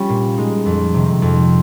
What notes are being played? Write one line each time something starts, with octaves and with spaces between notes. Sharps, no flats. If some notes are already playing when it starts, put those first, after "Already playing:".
Already playing: G3 C#4 F4
A#2
G#3 D#4
F2
C3 D#3
F2